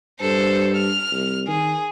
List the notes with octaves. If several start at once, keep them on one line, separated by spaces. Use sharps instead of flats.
G2 A4 C5
F6
C2
D#3 G#4